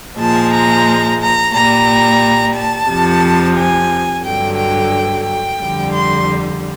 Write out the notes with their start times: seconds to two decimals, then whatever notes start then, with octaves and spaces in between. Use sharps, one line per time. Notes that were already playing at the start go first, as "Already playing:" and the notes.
0.19 A#2 F3 G#3 A5
0.53 A#5
1.21 A#5
1.53 A#2 G3 A#5
2.55 A5
2.89 F2 C3 F3
3.56 G#5
4.24 G2 D3 F#3 G5
4.57 G5
5.25 G5
5.59 F2 D3 G3
5.93 C6